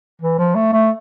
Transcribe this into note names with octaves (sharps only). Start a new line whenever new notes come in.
E3
F3
A3
A3